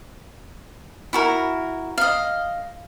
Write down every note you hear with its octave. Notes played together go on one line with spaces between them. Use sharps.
E4 F#4 A#4
D#5 F5